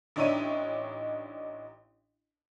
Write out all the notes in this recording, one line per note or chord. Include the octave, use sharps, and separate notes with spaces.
A1 D4 D#4 C#5 E5 D#7